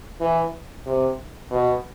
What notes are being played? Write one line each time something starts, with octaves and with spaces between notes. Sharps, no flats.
E3
C3
B2